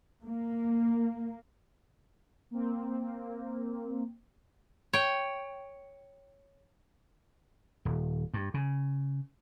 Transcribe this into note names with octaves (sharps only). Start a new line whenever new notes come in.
A#3
A#3 C4
C#5 G5
D#1
G2
C#3